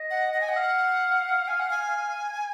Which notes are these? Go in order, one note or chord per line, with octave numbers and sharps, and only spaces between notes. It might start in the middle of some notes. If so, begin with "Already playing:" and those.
Already playing: D#5
F#5
F#5
G#5
D#5 F#5
F5
G#5
F#5
G#5